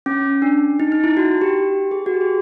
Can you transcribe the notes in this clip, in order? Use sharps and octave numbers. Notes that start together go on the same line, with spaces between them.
C#4
D4
D#4
D#4
E4
F#4
G4
G#4
F#4
G4
G#4